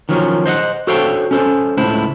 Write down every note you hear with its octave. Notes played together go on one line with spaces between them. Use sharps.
D#3 F3 F#3 C#4
C5 D#5 E5 F#5
F#4 A4 C5 C#5 F5 G5
C#4 A4 C5
C#2 A2 E4 C5